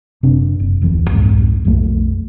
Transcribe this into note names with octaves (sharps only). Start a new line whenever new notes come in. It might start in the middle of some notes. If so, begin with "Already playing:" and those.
F#1 C3 C4 D4
F#1
D1 F2 E3
C2 F2 G#2
B1 F2 A3